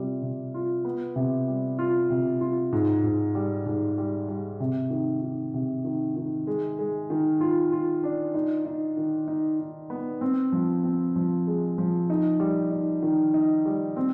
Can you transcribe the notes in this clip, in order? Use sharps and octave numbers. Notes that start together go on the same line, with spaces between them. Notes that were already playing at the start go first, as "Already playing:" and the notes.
Already playing: C3 G3 F4
C3
F4
B3
C3
G3
F4
C3
F4
G#2
G#2
G3
G#2
G3
G3
C3
D#3
D#3
C3
D#3
D#3
G#3
G#3
D#3
F4
F4
D4
D#4
D#4
D#3
D#4
D#4
B3
C4
F3
C4
F3
G#3
F3
D#4
G3
D#4
D#3
D#4
G3
C4